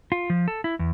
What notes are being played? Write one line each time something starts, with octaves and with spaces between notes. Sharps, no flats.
F4
F3
A4
E4
E2